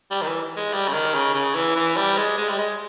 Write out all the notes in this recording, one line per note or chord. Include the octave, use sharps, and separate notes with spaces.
G3
D#3
E3
G#3
G3
C#3
D#3
C#3
C#3
E3
E3
G3
G#3
G#3
G3
G#3